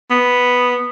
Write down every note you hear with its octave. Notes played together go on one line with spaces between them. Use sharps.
B3